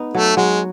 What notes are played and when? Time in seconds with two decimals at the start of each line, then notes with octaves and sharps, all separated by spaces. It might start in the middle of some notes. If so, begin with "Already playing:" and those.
Already playing: B3 D#4
0.14 F#3 A3
0.37 F#3 G#3